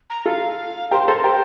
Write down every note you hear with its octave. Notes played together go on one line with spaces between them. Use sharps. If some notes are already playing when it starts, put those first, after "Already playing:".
A#5
F4 A4 F5
G4 A#4 C5
A4 A#4 C5
G4 A#4 C5